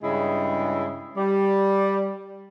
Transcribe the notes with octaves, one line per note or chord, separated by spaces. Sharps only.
G2 C#3 G#3 E4
G3